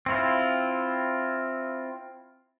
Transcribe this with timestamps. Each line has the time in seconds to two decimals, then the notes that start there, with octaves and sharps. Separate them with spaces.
0.06 C4 E4 F4